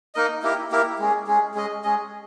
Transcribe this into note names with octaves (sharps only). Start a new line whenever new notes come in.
A#3 D#4 A#4 D#5
A#3 E4 G4 A#4
A#3 E4 G4 A#4
G#3 C#4 G#4
G#3 C#4 G#4
G#3 C#4 G#4 D#5
G#3 C#4 G#4 D#5